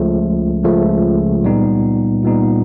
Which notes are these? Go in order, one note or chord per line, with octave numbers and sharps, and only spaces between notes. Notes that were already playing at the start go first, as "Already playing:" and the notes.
Already playing: C#2 C#3 F3 A3
C#2 C#3 F3 A3
A#2 G3 B3 D#4
A#2 G3 B3 D#4